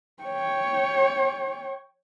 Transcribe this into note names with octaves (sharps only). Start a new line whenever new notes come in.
C#5 G5